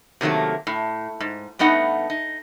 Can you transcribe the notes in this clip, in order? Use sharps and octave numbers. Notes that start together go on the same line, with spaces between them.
C3 D#3 F#3 A3 A#3
A2
G#2
G2 A3 B3 D#4 F#5
D#4